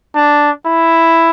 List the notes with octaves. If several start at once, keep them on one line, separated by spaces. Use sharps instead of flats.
D4
E4